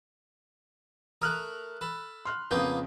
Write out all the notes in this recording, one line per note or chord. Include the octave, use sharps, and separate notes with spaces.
A3 A#4 D#6 F6 F#6
A4 B5
C6 F6 F#6
F2 C#3 A#3 B3 F4 D#6 G6